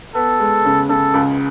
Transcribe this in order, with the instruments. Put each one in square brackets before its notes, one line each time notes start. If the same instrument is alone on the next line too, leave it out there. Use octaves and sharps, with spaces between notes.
[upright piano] B3 [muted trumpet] A4
[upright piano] G#3
C#3
[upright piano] C#3 [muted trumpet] A4
[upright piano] C#2